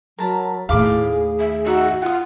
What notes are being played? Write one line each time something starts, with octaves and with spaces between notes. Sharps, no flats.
F#3 A#4 A5 B5
D#2 A2 G#4 F5 B5 D6
E5
D#4 F#4 E5
F4 F#5 D#6